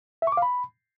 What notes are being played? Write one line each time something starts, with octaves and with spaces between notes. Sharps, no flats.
E5
C#6
D6
F5
B5